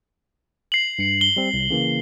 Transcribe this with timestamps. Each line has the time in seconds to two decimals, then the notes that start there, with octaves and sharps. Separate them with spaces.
0.72 C7 F#7
0.99 G2 C#7
1.21 G7
1.36 G3 C4
1.54 C2
1.70 C#3 E3 A#3